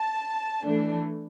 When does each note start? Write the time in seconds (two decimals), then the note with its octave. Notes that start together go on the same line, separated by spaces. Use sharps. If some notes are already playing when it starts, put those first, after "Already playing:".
Already playing: A5
0.66 E3 A3 D4